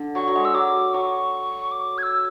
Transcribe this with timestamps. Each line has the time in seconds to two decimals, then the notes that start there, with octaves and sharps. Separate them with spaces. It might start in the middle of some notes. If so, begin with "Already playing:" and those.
Already playing: D3
0.15 F#3 C#6
0.28 F#3
0.35 G#3
0.45 E6
0.54 F#3 D6
0.94 F#3 C#6
1.72 D6
1.98 G#6
2.03 E6